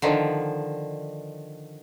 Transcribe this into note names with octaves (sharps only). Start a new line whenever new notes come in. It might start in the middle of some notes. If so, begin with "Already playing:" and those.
D3 D#3 F3